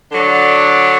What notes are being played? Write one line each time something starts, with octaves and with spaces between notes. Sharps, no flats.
D3 F#3 D4